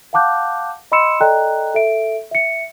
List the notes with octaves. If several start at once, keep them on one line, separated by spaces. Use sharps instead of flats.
F5 F#5 A5 D6 F#6 G6
D#5 B5 C6 E6 C#7 E7
A4 D5 D#5 G5 A#5 F#6
A4 E5 D7
E5 C#7